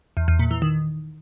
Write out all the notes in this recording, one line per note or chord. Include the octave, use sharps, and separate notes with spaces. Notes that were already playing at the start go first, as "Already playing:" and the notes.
E2
E2
A#2
E3
D#3